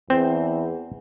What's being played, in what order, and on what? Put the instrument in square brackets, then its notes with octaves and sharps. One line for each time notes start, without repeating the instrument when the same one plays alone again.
[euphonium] E2 [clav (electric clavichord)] C4